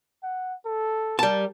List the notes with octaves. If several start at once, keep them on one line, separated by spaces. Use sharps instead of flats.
F#5
A4
G3 A#4 A5